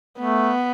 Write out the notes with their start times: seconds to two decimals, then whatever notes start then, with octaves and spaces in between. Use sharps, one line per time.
0.19 A3 B3